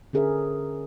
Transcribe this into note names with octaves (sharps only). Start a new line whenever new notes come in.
D3 C#4 G#4 A#4 C5 E5